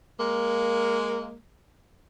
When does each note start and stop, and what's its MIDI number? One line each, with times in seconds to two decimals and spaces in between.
0.20 1.36 56
0.20 1.36 58